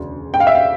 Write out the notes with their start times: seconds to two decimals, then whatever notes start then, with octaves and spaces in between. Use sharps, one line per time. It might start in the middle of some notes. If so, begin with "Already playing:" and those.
Already playing: E1 D2 C#3
0.34 G5
0.40 F5
0.47 E5
0.55 F5